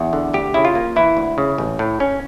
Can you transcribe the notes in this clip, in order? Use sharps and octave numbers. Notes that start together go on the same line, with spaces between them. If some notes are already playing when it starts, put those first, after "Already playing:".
Already playing: E2
D3
D2 G4
C#3 E4
F4
A#3
E3 E4
D2
C#3
A1
A2
C#4